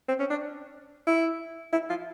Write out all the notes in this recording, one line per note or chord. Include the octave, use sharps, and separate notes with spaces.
C4
C#4
D4
E4
E4
F4